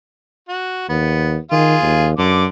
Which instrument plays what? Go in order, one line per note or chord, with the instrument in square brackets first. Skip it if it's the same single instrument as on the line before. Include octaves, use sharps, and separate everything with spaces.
[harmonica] F#4
[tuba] D#2 [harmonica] B3
[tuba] D#3 [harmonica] F4 G#4 F5
[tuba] D#2
[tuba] F#2 [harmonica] D3 D6